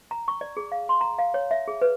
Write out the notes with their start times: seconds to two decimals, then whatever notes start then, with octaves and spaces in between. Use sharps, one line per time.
0.11 A#5
0.28 C#6
0.41 D5
0.57 G#4
0.72 F5
0.89 C6
1.01 A#5
1.19 F5
1.34 C#5
1.51 E5
1.68 G#4
1.81 B4